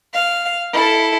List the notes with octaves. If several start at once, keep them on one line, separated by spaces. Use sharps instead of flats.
F5
E4 A4